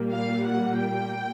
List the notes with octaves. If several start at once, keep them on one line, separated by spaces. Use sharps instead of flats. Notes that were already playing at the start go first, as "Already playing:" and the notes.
Already playing: A#2 G3 A#3
F5
F#5
G5